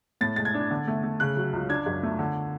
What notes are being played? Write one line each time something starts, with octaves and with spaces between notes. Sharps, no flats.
A2 A6
G#3 A6
G#6
D4
D3
A3
A3
C#3 F#6
F#3
C#2
D4 G#6
F#2
A3
D3